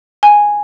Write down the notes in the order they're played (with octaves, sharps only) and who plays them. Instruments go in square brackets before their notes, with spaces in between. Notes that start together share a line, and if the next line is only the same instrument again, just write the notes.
[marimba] G#5